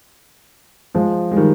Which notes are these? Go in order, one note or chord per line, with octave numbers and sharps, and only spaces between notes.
F3 G#3
G#3
D#3 G3